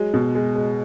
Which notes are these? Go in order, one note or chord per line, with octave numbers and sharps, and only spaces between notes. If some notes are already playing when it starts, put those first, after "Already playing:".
Already playing: F#3 G#3
B2
G#3
G#3